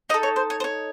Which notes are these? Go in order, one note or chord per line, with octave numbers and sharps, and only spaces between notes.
D#4 A4 D#5
C#5
C5
C#5
C5
C#5